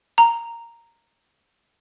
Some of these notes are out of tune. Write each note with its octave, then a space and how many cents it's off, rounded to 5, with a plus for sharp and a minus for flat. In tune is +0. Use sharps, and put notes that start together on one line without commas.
A#5 -5